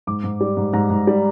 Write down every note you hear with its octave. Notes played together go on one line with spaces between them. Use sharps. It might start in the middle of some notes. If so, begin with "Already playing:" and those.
G#2 D6
G#2
G3
G#2
G#2 A#5
G#2
G3